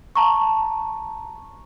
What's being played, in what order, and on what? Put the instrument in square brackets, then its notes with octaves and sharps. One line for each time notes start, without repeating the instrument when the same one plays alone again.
[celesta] A5 A#5 C#6